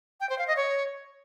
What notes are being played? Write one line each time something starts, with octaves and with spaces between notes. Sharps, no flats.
G5
C5
F5
D#5
C#5